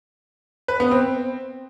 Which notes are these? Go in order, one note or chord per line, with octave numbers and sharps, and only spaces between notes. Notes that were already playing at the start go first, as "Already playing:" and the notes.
B4
B3
C4